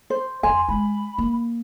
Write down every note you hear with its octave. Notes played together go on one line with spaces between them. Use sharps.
C5
F2 G#5 C6
G#3 B5
A#3